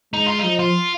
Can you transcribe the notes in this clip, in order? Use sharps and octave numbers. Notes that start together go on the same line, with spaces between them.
G#3 D#4
F4
F3 D#4
F4